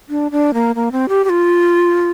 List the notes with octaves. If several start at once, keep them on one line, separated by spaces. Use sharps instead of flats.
D4
D4
A#3
A#3
C4
G4
G4
F4